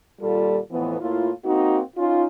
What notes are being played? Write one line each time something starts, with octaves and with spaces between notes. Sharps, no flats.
D#2 A#2 G3 F4 A4
F2 A2 E3 B3
A2 A#3 E4 F4
A#3 C4 D#4 F#4
C#4 D#4 F4